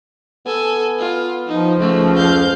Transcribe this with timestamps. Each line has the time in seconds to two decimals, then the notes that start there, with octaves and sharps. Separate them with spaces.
0.46 B3 A4 G#5
0.99 F4
1.48 F3 D#4
1.79 C#2 A3
2.17 F2 F5 G6